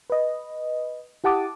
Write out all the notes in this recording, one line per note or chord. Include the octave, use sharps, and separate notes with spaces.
B4 D#5
E4 G4 F#5 A5 D6 D#6